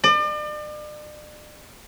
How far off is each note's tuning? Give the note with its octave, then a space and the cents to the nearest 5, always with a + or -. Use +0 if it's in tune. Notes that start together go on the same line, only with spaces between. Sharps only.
D5 +40